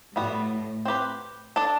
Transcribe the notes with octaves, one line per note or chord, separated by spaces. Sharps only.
A2 G3 B3 F#4
C4 G4 B4
D4 A4 D5